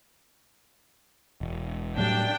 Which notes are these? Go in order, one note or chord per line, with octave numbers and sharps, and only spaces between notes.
E1
A2 F#3 G3 D4 G5